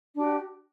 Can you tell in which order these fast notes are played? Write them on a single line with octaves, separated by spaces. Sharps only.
D4 F#4 G4